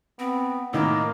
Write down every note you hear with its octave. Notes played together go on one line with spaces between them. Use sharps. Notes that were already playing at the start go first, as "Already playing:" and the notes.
B3 C4
A2 D#3 A#3 D#5